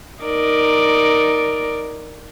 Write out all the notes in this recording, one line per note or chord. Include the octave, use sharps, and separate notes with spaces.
D#4 A#4 D5